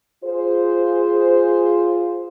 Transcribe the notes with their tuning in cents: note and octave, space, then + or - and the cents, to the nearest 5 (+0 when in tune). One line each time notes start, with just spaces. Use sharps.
F4 +0 G#4 +0 C5 -5